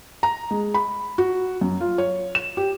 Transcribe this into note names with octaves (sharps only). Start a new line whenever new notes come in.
A#5
G#3
B5
F#4
F#2
F4
C#5
E7
G4